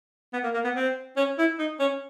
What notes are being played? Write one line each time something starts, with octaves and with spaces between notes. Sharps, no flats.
B3
A#3
A#3
B3
C4
C#4
E4
D#4
C#4